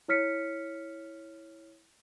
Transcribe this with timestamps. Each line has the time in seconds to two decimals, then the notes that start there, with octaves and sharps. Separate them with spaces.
0.08 E4 C#5 F6 B6 C#7